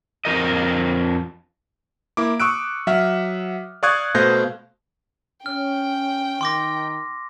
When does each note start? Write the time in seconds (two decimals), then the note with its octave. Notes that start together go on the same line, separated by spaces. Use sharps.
0.25 F2 A#4 D#5
2.17 A#3 E4 D6
2.40 C#6 D#6 E6 F#6 D7
2.87 F#3 E5 F#5 F6
3.83 D5 F5 C#6 D#6 F#6 G#6
4.15 B2 A3 C5 F5 G6 A#6
5.46 C#4 G5 F6
6.41 D#3 C6 D6 A#6